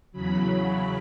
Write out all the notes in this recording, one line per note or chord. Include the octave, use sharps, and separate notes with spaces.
E2 C#3 F#3 B5